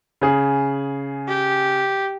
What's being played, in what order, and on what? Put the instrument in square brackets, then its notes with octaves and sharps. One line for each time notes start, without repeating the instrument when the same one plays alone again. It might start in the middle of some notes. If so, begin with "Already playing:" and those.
[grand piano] C#3 G#4
[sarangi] G4